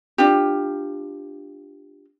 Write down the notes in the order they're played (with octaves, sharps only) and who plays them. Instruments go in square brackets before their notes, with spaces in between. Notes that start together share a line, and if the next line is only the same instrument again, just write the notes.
[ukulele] D4 F4 G4